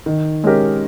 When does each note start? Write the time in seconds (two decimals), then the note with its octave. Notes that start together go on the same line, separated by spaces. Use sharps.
0.06 D#3
0.44 G#3 C#4 G4 A#4